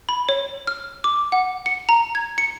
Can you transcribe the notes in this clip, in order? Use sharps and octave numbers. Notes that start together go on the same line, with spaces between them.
B5
C#5
F6
D6
F#5
C#7
A#5
G#6
C#7